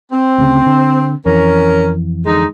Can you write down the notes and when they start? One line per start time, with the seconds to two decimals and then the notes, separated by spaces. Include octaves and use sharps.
0.12 C4
0.38 D2 C#3
0.66 D3
1.26 F2 E3 C#4 A#4
2.26 D3 G#3 D#4